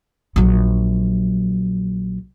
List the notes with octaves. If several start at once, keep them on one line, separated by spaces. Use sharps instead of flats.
A#1 F#3